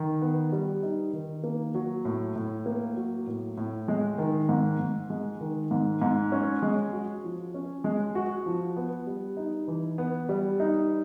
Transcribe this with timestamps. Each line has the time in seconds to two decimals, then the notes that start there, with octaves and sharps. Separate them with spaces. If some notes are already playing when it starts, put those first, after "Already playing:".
Already playing: D#3
0.22 B3
0.52 G3
0.83 D#4
1.13 D#3
1.43 A#3
1.75 F#3
2.05 A2
2.36 A2
2.66 A#3
2.96 F#3
3.27 A2
3.57 A2
3.88 G#3
4.18 D#3
4.49 G#2
4.80 G#2
5.10 G#3
5.41 D#3
5.71 G#2
6.02 G#2
6.32 C#4
6.62 G#3
6.93 F#4
7.24 F3
7.54 C#4
7.84 G#3
8.15 F#4
8.46 F3
8.76 B3
9.07 G3
9.37 D#4
9.68 E3
9.98 B3
10.29 G3
10.60 D#4